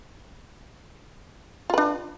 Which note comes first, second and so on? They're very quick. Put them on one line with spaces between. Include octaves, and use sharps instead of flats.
F4 B4 D4